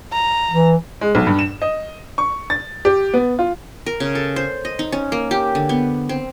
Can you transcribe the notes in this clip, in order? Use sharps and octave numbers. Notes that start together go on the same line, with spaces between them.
A#5
E3
G#3
B1
G2
E7
D#5
C#6
A6
G4
B3
F4
A#4
C#3
A4
C5
D#5
D#4
C#4
A#3
G4
D3
B3
C4